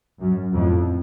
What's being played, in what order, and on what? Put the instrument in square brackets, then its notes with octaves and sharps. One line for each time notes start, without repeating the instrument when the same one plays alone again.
[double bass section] F#2
F2 A2